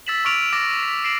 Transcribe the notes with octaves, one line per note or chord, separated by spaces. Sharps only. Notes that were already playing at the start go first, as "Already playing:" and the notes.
E6 A6 B6 E7 F#7
C#6 D6 F6 D7 F7 F#7
D6 A6 A#6
B6
C7 D7 E7 F#7